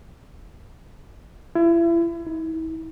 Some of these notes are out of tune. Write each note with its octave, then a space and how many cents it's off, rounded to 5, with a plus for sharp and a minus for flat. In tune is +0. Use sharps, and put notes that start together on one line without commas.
E4 +35
E4 -40